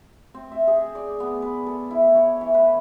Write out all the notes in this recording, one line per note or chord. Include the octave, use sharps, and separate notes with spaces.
C4
E5
G#4
D5
B3
B4
A4
E4
C#5
E3
B4